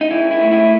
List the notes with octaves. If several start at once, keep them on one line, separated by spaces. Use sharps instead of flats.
D#4
C#2 E4
E4
A3
E4